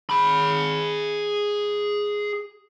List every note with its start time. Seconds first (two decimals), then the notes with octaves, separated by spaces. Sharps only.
0.10 G#4 B5